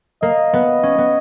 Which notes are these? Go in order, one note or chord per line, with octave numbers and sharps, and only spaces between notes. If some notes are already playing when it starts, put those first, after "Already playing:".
A#3 D#5
B3
C#4
B3